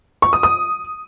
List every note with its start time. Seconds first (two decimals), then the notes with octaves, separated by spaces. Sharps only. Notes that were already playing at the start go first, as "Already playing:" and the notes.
0.22 C#6
0.33 D#6
0.43 D#6